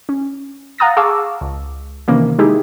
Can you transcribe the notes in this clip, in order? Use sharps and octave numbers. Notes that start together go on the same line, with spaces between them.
C#4
F5 F#5 A#5 D#6 A6 A#6
G#4 F5 A5 C#6 D6 E6
C#2
C3 D#3 E3 A#3 C#4
G#3 D#4 E4 G4 G#4